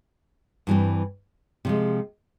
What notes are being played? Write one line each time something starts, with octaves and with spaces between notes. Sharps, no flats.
G2 E3 G3 C4
C3 F3 G#3